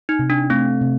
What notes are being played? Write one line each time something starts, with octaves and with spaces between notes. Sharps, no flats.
D#4
C3
D4
A3 C4
C3